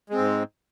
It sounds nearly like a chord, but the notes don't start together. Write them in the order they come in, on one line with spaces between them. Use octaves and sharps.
G#3 C4 G#2